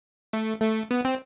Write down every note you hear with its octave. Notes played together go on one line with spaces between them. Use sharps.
A3
A3
B3
C4